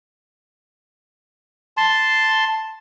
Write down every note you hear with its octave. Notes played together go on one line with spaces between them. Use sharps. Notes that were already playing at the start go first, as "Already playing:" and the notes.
A5 C6